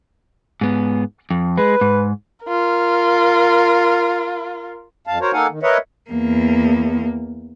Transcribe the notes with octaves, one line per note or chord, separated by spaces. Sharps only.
G#2 B3
F2
G#3 B4
G#2
F4 A#4
F2 F5 A5
F#4 A#4 C5 C#5
A#3 D#4 A4 F5 F#5 G#5
D#3
A#4 B4 C#5 D#5 E5 F#5
E2 A#3